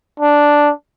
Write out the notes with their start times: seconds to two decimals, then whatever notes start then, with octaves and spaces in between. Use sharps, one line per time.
0.20 D4